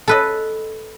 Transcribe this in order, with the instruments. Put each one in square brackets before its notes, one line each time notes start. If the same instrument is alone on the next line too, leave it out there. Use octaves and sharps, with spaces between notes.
[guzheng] A4 B4 D#5